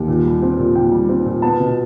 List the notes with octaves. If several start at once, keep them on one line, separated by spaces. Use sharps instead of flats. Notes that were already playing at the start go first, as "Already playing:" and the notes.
Already playing: D#2
A#2
G3
C4
A#2
A#2 G5
G3
C4
A#2
B3 A5
B2